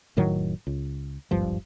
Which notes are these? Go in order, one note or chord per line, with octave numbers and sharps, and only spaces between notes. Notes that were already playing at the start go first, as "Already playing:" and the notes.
F1 A2 D#3 F#3
C#2
D#1 G#1 G2 F3